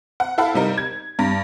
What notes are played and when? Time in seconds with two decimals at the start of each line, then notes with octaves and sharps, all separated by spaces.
0.20 F#5
0.38 E4 A4 F5 F#5 B5
0.54 C3 G3 D#4 A#4
0.78 G#6
1.19 G2